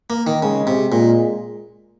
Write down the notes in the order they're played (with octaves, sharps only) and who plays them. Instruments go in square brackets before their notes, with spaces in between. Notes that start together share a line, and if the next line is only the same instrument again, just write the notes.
[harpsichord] A#3
D#3
[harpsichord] C#3 [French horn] G#3
[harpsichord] C3
[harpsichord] A#2 [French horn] G#3